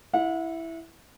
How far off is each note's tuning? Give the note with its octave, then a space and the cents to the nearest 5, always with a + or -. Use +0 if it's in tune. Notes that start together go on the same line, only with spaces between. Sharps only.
E4 +0 F#5 -35